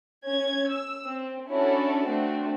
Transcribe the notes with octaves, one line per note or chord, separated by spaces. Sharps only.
C#4 G#6
E6
C4
C#4 D4 E4 F#4 A4 D5
A3 C4 D4 F#4